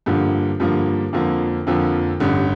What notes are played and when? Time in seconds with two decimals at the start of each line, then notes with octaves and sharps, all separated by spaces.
0.06 G2 D3 F3 A#3
0.60 G2 D3 F3 A#3
1.13 F2 D3 F3 A#3
1.67 F2 D3 F3 A#3
2.20 A1 G2 D3